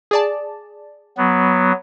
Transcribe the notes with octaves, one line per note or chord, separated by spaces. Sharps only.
G#4 D5 A5
F#3 B3